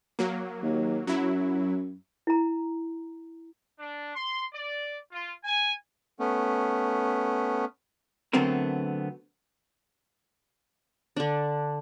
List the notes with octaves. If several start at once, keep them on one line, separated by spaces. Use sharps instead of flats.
F#3 A#3
D#2
F#2 F#3 E4
E4 A#5
D4
C6
D5
F4
G#5
A3 B3 C#4
D3 F#3 A3 B3 C4 A#4
D3 D4